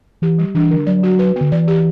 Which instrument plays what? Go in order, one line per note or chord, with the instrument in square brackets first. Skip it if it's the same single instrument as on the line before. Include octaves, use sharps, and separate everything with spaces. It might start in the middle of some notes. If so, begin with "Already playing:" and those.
[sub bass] E3 [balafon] G4
[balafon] G3
[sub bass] E3 [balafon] D4
[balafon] D3
[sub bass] F#3 [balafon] D5
[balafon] F#4
B4
[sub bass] D3 [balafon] B3
[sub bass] E3 [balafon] D5
[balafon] G4